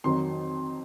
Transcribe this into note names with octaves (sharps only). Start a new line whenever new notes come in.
F2 D#3 F#3 C6